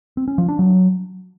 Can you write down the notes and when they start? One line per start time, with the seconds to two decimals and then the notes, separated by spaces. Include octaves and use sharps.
0.17 C4
0.28 C#4
0.38 F3
0.49 D4
0.59 F#3